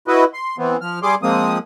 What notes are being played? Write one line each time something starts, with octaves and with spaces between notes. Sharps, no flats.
E4 F#4 B4 D#5
C6
E3 B3 C4
F3 F6
G3 G#4 C6 D6
F3 G#3 A#3 C4 D#6